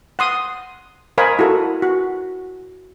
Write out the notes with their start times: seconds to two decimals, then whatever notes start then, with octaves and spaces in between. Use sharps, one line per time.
0.19 F#5 C6 D#6
1.18 A#4 C5 D#5 F5 G#5 B5
1.39 E4 F#4 A4 A#4
1.82 F#4